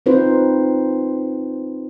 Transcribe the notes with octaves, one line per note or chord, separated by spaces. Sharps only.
C4 D#4 F4 B4 C5